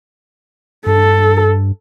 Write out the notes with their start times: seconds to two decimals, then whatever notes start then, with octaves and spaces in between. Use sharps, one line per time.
0.86 G2 A4